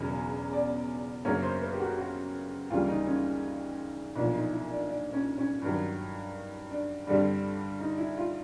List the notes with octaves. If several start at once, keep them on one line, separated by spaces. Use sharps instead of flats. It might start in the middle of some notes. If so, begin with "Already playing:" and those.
Already playing: E1 E2 C#3 F#3 B3 C#5
D5
F#2 C#3 F#3 A#3 C#4 C#5
C5
B4
G4
F#4
F#4
D2 C#3 E3 G3 A#3 F4
D#4
C#4
B1 A#2 F3 D4
D#4
E4
D4
D4
C#4
C#4
G2 D#3 F#3
D4
G2 D3 G3 C4 D4
D#4
E4
F4